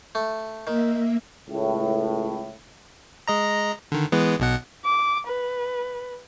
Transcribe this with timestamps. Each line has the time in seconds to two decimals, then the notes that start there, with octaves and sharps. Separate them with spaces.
0.15 A3
0.67 D#3 A#3 E5
1.50 C#2 A2
3.28 G#3 D#5 A#5
3.92 D3 D#3
4.12 E3 G#3 B3
4.40 B1 B2 F#5
4.85 D6
5.27 B4